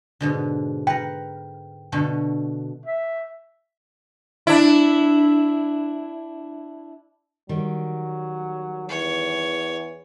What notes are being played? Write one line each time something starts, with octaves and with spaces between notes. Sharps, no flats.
G#2 B2 D3
A#4 B4 G5
B2 D3 A3
E5
D4 E4
D#3 F#3 G3
E2 C#5